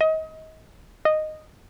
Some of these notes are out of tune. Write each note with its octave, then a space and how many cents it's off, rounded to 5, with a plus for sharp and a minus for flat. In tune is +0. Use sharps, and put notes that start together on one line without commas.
D#5 +30
D#5 -10